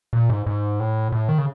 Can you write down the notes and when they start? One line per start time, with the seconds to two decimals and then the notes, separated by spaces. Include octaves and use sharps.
0.13 A#2
0.30 G#2
0.47 G#2
0.80 A2
1.12 A2
1.29 D#3
1.38 C#3